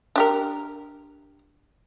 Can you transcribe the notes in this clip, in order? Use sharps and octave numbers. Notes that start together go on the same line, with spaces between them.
D4 G4 A#4